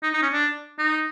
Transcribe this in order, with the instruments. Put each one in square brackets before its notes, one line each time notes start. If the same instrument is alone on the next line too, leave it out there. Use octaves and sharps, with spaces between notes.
[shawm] D#4
D#4
C#4
D4
D#4